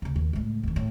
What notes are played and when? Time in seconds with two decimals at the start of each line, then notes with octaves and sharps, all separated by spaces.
0.02 D2 C#3
0.16 D#2
0.33 C#2 A2
0.63 E2 D#3
0.76 A2